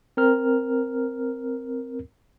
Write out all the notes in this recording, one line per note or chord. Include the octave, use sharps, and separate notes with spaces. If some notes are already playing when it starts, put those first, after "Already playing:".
C4 A#4 F6